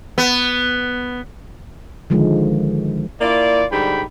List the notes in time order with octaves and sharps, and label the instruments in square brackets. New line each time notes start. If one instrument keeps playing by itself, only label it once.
[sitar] B3
[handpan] D3 D#3 F3 G#3
[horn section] A#3 E4 F4 D5
G#2 D3 G3 D#4 G5 B5